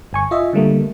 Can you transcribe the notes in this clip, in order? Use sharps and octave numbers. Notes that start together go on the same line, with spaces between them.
G1 G#5 C#6
F4 D#5 E5
D3 G3 A3 A#3